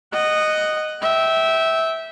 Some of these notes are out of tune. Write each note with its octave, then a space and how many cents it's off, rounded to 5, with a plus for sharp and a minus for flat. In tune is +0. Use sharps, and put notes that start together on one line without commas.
D#5 -10 F#5 +10
E5 -15 G5 -15